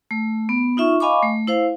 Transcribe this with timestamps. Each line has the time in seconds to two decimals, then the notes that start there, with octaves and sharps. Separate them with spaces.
0.11 A3
0.49 B3
0.77 D#4 F4 E5 C#6
1.00 D#5 F5 G#5 B5 C#6 D6
1.23 A3
1.47 E4 C5 F5